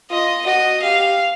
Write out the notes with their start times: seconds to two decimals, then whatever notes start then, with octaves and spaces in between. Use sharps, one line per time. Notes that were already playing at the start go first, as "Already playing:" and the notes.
0.10 F4 D#5
0.46 F#4 D#5
0.83 G4 F5